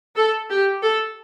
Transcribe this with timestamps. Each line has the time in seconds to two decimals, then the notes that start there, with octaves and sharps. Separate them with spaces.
0.16 A4
0.50 G4
0.82 A4